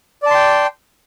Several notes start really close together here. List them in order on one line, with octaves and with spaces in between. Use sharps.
D5 A5 C6 G5